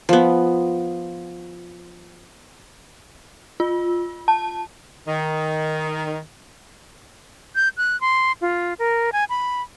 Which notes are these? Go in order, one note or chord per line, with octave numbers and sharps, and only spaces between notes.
F3 B3
F4
A5
D#3
G6
F#6
C6
F4
A#4
G#5
B5